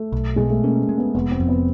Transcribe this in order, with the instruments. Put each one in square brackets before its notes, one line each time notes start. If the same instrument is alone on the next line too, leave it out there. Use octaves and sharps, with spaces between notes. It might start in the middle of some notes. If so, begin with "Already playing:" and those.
Already playing: [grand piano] A3
[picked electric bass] B1
[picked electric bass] B2 [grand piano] G#3
[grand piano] A3
[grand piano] A#3 [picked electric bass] C#4
[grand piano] A#3
[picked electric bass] G#3
[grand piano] B3
[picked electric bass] F1 [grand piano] B3
[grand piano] C4
[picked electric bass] F2
[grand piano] B3